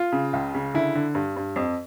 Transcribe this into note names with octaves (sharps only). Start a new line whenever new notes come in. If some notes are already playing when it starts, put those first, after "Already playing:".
Already playing: F4
C#3
C#2
C#3
D3 E4
D3
G2
G2
F2